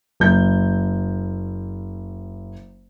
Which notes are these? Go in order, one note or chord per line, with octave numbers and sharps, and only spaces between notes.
F#1 G6